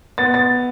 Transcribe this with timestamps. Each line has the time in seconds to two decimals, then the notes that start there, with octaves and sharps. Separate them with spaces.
0.18 B3 A6
0.34 A6